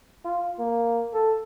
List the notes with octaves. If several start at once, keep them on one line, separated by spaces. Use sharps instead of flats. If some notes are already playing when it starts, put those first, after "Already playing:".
F4
A#3
A4